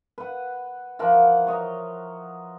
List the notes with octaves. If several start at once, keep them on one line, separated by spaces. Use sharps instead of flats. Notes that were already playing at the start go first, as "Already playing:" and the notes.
B4 F#5
E3 F3 A#4 F#5
C#5 D#5 A#5